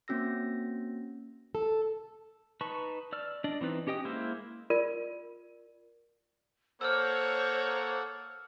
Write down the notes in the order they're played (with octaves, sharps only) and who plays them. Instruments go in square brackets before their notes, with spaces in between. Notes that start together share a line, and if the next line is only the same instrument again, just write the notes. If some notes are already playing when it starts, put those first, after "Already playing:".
[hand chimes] A#3 C4 C#4 F#4 E6 A#6
[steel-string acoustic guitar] A4
[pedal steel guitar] D#4 B4 A5 C#6
D5 E6 F6
D4 D5 D#5
E3 C4 D#4 B4
C#4 G4 D#5 G5 D#6
G#3 A#3 E4 C5 E6
[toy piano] F4 A#4 D5
[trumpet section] A#3 C#5 [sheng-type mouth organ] A4 F#5 [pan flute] C5 [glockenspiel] E6 F6